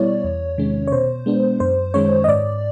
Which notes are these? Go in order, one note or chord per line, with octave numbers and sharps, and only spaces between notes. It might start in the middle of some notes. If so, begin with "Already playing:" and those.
Already playing: B2 G3 B3 E4 C#5 D5
E2
C3 D#3 G#3 C#4
C#5
B2 C5
G#3 B3 D4
F#2 C5
D#3 G#3 C#4 C#5
D#5
G#2 D5